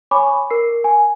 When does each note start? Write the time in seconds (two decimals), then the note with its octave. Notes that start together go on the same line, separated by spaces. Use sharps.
0.11 C#5 G#5 B5 C#6 D6
0.50 A#4 C7
0.84 G#5